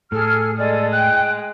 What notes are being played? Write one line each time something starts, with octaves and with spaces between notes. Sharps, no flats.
A2 G#4 A4 F6
G#3 A4 D5 G#5
G5 F#6